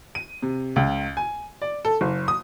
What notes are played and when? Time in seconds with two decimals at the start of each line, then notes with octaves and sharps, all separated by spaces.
0.15 D#7
0.42 C3
0.76 C#2
1.17 G#5
1.62 D5
1.85 A4
2.01 F#1
2.28 D#6